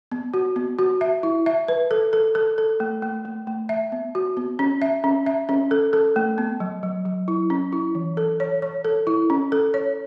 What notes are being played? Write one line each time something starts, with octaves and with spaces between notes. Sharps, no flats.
B3
F#4
B3
F#4
E5
E4
E5
B4
A4
A4
A4
A4
A3
A3
A3
A3
E5
B3
F#4
B3
C#4
E5
C#4
E5
C#4
A4
A4
A3
B3
F#3
F#3
F#3
E4
C#4
E4
E3
A4
C#5
C#5
A4
E4
C#4
A4
C#5